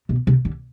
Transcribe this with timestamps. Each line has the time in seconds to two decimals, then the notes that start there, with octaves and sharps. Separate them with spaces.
0.09 B2
0.27 C3
0.45 D3